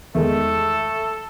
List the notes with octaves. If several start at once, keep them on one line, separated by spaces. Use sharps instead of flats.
E2 D#3 G#3 A3 A4